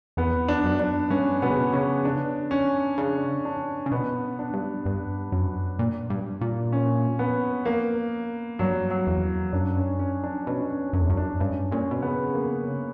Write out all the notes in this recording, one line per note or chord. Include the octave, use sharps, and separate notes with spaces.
E2 B3
D4
F#2
D4
G2 C#4
B2 B3
C#3
B2
C#3 C#4
D4
C#4
C#3 D4
D4
C#3
B2 B3
D4
G2
G2
F#2
A#2
G2
A#2
C#4
B3
A#3
G2 F#3
F#3
E2
F#2 D4
C#4
C#4
D4
B2 C#4
C#4
F#2 C#4
E2
F#2
D4
G2 C#4
A#2 C#4
B2
C#3 B3
A#3